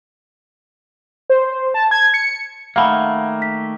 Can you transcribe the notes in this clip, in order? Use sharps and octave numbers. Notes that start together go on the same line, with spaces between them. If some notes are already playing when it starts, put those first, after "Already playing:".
C5
A5
G#6
C#7
D#3 A3 A#3 F5 F#5 B5
B6